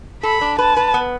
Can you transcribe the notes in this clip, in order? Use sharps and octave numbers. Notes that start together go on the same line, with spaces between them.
A4 B5
D4
B4 A5
B4
B3